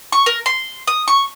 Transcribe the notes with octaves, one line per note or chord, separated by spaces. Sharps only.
C#6
A#4
C6
D#6
C#6